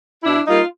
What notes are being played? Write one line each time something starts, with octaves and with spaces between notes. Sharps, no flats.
B2 D4 E4
G3 A#3 D#4 F4